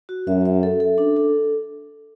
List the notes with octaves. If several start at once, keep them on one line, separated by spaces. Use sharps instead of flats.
F#4
F#2 E5
E5
A4
A4
D4
A4